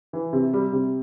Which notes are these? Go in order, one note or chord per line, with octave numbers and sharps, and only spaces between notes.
E3
C3
G3
C3